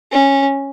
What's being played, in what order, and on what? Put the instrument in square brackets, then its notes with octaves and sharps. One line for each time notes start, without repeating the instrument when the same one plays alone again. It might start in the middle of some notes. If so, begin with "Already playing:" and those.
[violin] C#4